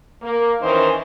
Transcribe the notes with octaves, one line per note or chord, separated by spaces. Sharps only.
A#3
D#3 E3 C#4 D#4 A#4 C5